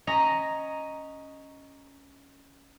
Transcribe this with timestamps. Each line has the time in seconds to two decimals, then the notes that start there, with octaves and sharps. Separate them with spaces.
0.07 C#4 D#5 A#5